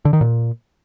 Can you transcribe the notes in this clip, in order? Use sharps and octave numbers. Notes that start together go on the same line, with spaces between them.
D3
D#3
A#2